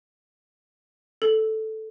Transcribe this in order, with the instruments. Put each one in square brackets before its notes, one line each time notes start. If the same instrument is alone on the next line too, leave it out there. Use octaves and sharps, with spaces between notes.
[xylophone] A4